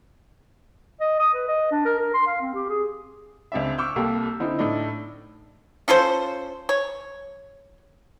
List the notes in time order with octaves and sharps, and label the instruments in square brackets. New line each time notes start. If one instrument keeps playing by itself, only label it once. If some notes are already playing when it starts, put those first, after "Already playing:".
[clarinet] D#5
D#6
B4
D#5
D4
A#4
A#4
C6
F5
C4
G4
G#4
[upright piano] C#2 C4 D4 E5
C#6 D6 E6 F6 G6
C2 A#3 G4 A4
D3 C4 D#4 E4
A2 A3 D4 D#4
[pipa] C#4 F4 A4 C5
C#5